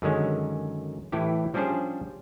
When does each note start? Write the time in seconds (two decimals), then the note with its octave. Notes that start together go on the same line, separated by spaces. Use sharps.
0.02 F#2 D3 D#3 G#3 C#4
1.12 A2 E3 E4 G4
1.54 F3 G3 C#4 D4 G#4 C5